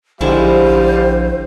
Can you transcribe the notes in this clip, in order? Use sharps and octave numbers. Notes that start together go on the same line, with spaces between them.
A#1 D3 G3 G#3 E4 C5 F5